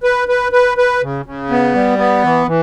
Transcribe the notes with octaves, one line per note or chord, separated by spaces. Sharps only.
B4
B4
B4
B4
C#3
C#3
B3
G3
B3
E3
E3